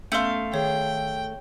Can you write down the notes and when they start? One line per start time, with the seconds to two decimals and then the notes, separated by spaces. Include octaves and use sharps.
0.12 A3 B3 C#4 F5 C6 G6
0.54 D#3 G#4 C#5 G5